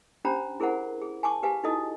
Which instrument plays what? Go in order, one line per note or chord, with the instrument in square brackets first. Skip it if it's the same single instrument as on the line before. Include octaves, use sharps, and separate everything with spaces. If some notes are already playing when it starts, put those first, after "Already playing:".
[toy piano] C#4 D4 G4 C5 A#5 B5
E4 G#4 A#4 C5 F#5
G#4
G#5 A5 C#6 D6
G4 B4 F5 G#5
D#4 E4 F#4 A4 D#5 D#6